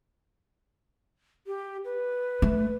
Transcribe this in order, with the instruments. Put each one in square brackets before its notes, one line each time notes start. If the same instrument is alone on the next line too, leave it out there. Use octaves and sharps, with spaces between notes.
[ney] G4
B4
[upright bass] A3